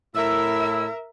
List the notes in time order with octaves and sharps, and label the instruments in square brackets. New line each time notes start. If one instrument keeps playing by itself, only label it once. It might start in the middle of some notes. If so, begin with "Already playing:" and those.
[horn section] A2 E4 [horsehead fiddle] A#4 E5 [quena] E6